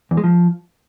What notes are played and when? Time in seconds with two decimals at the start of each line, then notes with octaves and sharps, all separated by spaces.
0.11 E2
0.17 G#3
0.24 F3